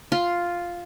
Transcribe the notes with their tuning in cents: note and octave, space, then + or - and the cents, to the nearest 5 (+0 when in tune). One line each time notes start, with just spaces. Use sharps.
F4 +0 C6 +0